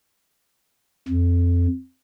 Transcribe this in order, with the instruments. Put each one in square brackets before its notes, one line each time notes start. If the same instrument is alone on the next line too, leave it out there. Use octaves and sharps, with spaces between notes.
[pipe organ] F2